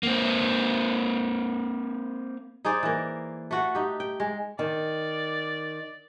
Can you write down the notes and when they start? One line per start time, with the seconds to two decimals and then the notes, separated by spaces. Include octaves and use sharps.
0.03 A#3 C4
2.65 D#4 G#4 C5 D5
2.83 E3 A#3
3.51 A3 F#4 F#5
3.75 D#4 G4
4.00 G5
4.20 G#3
4.59 D#3 D5